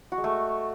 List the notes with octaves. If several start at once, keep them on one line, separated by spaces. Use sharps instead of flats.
F#4
G#3
A3